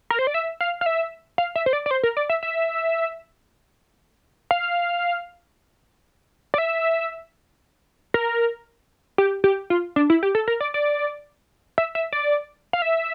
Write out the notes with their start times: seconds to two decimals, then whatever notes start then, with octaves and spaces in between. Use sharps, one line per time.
0.10 A#4
0.19 C5
0.27 D5
0.34 E5
0.61 F5
0.81 F5
0.86 E5
1.38 F5
1.56 E5
1.66 C5
1.73 D5
1.86 D5
1.91 C5
2.03 A#4
2.17 D5
2.30 E5
2.43 E5
4.51 F5
6.54 D5
6.58 E5
8.14 A#4
9.18 G4
9.44 G4
9.70 F4
9.96 D4
10.10 E4
10.23 G4
10.35 A4
10.48 A#4
10.61 D5
10.74 D5
11.78 E5
11.95 E5
12.12 D5
12.73 F5
12.82 E5